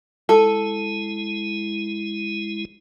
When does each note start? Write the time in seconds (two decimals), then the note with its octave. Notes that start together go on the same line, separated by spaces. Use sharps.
0.29 G#3 E4 A4